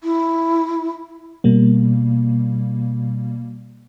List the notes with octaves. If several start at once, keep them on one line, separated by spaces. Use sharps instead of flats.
E4
B2 G3 A#3